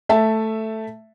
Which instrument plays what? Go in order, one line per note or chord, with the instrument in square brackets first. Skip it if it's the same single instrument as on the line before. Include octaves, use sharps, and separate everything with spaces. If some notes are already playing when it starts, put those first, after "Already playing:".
[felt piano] A3 E5 A5